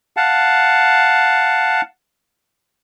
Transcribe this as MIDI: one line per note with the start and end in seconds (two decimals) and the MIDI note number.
0.17 1.81 77
0.17 1.81 78
0.17 1.81 81